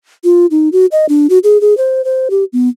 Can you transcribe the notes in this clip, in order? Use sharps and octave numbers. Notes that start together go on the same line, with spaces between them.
F4
D#4
F#4
D#5
D4
F#4
G#4
G#4
C5
C5
G4
B3